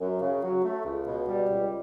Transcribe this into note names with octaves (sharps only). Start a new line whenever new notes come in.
F#2
C#3
F#3
A3
C#2
B2
G3
C#2